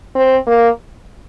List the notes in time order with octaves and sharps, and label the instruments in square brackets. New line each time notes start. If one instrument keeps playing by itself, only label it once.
[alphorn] C4
A#3